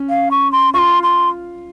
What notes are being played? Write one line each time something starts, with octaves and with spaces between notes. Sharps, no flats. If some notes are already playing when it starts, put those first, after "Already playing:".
Already playing: C#4
F5
C#6
C6
F4 C6 C#6
C6